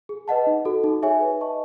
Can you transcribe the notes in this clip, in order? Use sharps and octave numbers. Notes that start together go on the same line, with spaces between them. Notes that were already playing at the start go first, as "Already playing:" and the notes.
G#4
B4 D#5 F#5 A5
D#4
F#4 A4
D#4
G#4 C#5 E5 G#5
B4
D#5 A5 C#6